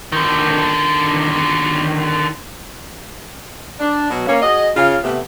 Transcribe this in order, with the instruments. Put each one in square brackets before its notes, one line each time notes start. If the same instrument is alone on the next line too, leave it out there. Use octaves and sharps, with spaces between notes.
[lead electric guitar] D3 D#3
[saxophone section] D4
B2 F#3 B3 F#4
A#3 C#4
F#4 G#4 D#5
C#3 F4
C3 A3 B3